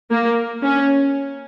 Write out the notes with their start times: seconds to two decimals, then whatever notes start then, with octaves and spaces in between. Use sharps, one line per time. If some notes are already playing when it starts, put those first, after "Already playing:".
0.11 A#3
0.64 C#4